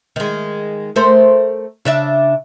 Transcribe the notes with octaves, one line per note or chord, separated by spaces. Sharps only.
D#3 G#3
A3 A#4 C5
C#3 D4 E5